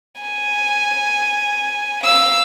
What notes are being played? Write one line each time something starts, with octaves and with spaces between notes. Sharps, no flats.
G#5
F5 E6